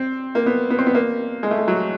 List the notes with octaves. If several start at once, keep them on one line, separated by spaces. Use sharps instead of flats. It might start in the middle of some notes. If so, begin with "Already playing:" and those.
Already playing: C4
A#3
B3
B3
C4
B3
A#3
G#3
A3
G#3
F#3